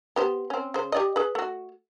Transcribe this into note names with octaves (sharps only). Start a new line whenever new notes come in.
B3 G4 C5
C4 C#4
C#3 C5
G4 D5 D#5
G#4 B4
A3 F#4